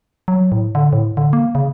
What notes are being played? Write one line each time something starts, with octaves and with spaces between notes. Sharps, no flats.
F#3
A2
D3
A2
D3
A#3
C#3